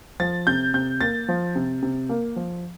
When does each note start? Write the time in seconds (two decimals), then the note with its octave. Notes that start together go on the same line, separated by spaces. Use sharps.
0.20 F3 A6
0.47 C3 G6
0.74 C3 G6
1.01 A#3 A6
1.29 F3
1.55 C3
1.82 C3
2.09 A#3
2.36 F3